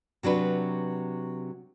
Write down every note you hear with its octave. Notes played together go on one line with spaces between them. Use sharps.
C3 F#3 D4 B4